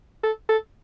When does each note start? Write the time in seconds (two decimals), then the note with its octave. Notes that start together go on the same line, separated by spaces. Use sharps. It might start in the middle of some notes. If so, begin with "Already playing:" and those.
0.23 A4
0.49 A4